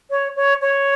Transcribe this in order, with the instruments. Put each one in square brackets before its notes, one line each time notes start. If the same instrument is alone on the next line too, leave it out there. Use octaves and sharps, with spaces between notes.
[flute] C#5
C#5
C#5